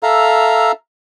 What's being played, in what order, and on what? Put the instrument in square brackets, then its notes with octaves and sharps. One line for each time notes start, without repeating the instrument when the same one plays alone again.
[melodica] A4 E5 F5 A#5